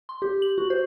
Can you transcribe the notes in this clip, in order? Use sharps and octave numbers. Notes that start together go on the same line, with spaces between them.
C6
G4
F#7
F#4
C5